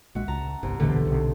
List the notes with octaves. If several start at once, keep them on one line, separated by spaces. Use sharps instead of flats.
A#1 G#3 F#4 E5
C#2 A5 A#5
G1 C2
A#1 E2 B2 D3 A3 G4
B1 C3